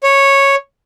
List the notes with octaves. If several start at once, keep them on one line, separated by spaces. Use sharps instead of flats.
C#5